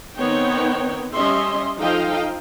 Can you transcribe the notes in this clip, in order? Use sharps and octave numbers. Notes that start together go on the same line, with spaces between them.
D#3 B3 C4 D#4 C#5 G5
G3 C#4 G4 D#5 E5 C6
F3 D#4 A4 D#5 F5 G5